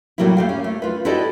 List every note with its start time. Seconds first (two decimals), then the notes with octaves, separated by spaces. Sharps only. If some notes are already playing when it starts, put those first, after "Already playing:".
0.18 A2 C3 F#3 G3 A#3 E4
0.37 A3 G4 F5
0.49 C#4
0.64 A3
0.82 F4 B4
1.05 E4 F#4 G4 A4 D5 D#5